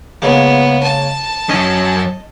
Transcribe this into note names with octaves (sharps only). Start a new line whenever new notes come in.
C#3 G#3 A#3 B3
A5
F#2 C#4 D#5